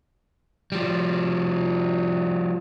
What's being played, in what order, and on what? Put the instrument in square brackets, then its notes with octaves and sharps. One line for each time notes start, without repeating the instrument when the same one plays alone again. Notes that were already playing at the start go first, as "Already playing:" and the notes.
[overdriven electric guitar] F3 G3